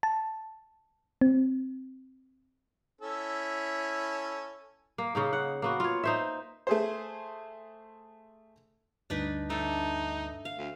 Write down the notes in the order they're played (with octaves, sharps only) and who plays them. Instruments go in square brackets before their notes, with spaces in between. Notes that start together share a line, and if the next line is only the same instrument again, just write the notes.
[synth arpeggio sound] A5
C4
[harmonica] C#4 E4 A4
[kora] A#3
C#3 A#3 D#4
F#5
A#3 B3 F#4
F4 C#5
D#4 C5 E5
[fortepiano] A3 G#4 C5
[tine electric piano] D2 G2 [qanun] D4 D#4 B4
[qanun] A3 D4 [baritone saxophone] D#4
[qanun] F5
[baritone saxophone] D2